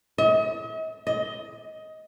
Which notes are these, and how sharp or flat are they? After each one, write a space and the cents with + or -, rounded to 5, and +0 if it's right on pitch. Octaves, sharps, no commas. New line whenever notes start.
D#5 +45
D#5 +15